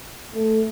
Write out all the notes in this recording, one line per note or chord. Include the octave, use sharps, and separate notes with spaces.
A3